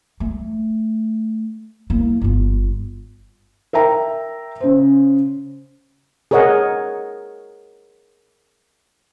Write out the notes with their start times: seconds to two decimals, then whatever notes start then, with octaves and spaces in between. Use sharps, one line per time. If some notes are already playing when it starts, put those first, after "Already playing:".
0.20 A3
1.90 A#3 E4
2.21 G1 F4
3.73 A#4 E5 G5 A#5
4.61 C#3 C5
6.31 G#4 A#4 C#5 D#5 F#5